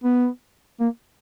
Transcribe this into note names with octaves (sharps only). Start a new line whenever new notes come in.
B3
A#3